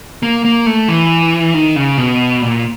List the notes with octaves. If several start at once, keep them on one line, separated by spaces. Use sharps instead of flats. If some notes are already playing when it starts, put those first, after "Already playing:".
A#3
A#3
A3
E3
D#3
C#3
B2
A#2